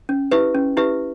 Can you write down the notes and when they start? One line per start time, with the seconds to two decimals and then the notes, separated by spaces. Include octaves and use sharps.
0.09 C#4
0.31 E4 G4 B4 E5
0.55 C#4
0.77 E4 G4 B4 E5